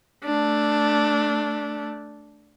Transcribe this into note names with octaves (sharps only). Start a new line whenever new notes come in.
A3 D4